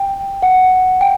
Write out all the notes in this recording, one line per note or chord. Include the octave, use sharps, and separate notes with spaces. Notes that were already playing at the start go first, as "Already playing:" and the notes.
Already playing: G5
F#5
G5